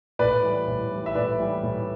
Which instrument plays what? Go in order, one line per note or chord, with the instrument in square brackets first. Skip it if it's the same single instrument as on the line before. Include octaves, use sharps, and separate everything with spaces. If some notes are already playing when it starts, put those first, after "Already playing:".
[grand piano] A2 B4 D5
E3 G3
A2
E3 G3
E5
A2 B4 D5
E3 G3
A2